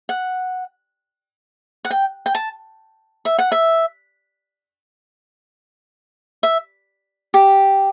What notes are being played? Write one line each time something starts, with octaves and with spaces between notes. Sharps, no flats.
F#5
F#5
G5
G5
A5
E5
F#5
E5
E5
G4